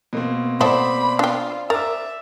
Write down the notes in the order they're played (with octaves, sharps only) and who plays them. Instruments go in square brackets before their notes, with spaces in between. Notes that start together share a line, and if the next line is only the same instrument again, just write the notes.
[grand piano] B2 A#3 C4
[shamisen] B3 E4 A4 [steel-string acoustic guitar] C5 D5 [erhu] B5
[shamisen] D4 G5 [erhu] F4
[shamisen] A#4 [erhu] E5 [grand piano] D6 E6 A6